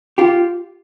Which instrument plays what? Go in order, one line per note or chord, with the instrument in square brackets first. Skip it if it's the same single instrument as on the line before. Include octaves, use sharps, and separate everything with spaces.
[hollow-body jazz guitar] F4 G4